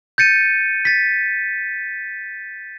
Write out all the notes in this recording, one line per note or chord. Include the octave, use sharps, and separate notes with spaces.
G6 A6 C#7 D#7
A6 B6